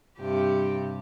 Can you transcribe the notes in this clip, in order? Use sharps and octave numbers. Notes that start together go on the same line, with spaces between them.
G2 C3 G4